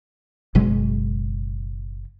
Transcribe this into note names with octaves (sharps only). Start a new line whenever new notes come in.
F#1 B2 F#3 G#3